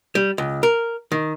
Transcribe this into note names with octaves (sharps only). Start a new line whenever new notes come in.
G3
C#2
A#4
D#3